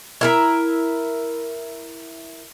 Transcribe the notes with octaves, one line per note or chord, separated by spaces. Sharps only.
E4 A#4 E5